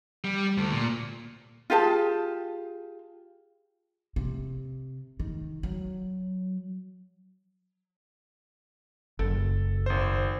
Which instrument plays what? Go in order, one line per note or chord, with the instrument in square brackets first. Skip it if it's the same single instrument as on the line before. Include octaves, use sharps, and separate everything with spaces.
[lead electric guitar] G3
D2
A#2
[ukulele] F4 G4 G#4 A5
[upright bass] C3
D#3
F#3
[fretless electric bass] F#1 [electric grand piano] A4
[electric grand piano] G#1 C5